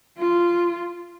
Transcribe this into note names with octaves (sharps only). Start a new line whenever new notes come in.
F4